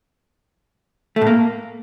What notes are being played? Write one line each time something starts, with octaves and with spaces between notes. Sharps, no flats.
A3
A2
A#3